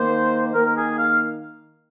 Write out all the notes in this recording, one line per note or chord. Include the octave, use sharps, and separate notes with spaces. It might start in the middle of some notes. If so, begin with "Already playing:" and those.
Already playing: D#3 A#3 C5
D#3 A#3 A#4
A#4
G#4
F5